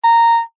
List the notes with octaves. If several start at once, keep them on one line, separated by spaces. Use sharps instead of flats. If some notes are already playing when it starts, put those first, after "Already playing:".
A#5